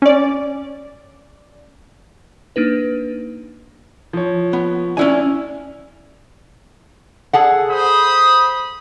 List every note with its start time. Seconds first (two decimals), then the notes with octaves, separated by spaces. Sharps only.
0.02 C#4 D5
2.56 A#3 D4 D#4 B4
4.13 F3 C#5
4.53 B3
4.97 C#4 D4 E4 G#5
7.33 G#4 A4 F#5
7.70 C5 B5 D#6